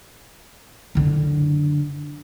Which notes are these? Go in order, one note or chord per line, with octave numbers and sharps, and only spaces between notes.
F#1 D3